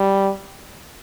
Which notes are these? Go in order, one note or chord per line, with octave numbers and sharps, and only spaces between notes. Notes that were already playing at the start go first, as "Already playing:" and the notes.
Already playing: G3